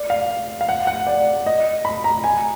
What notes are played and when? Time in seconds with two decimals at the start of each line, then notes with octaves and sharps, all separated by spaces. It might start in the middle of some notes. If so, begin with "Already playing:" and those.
Already playing: D5
0.10 F5
0.61 F5
0.69 F#5
0.87 F#5
1.07 D5
1.46 D#5
1.85 B5
2.04 A#5
2.24 G#5